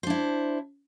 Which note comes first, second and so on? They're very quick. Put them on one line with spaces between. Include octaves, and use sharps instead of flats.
C5 D4 E4